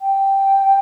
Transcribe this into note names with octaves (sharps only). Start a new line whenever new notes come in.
G5